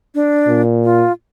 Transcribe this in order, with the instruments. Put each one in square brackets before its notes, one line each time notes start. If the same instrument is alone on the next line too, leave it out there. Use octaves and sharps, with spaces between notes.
[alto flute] D4
[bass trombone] A#2
[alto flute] F4